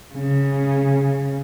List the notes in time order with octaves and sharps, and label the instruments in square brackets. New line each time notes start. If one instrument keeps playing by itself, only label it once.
[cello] C#3